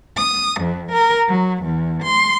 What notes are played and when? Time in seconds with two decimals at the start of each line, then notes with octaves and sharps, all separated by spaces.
0.17 D#6
0.60 F2
0.91 A#4
1.27 F#3
1.63 E2
2.03 C6